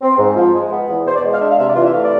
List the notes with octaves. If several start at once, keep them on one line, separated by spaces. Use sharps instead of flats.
C4
G#2
F3
G#3
B3
E2
B2 C5
D5
G#3
F5
D4 E5
F5
C3 E5
D5
E3 F4
E5
A3 F5
D5